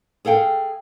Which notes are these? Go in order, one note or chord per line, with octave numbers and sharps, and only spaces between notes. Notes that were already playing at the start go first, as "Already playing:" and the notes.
G#4 A4 F5 G5